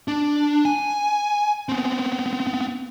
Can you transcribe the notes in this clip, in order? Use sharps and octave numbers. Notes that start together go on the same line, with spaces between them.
D4
G#5
B3 C4